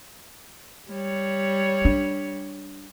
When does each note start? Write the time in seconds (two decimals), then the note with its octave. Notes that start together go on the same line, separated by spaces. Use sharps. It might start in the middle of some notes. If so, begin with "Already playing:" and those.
0.90 G3 C#5
1.85 D4